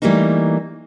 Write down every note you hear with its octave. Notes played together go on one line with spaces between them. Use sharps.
E3 G3 A3 A#3 D#4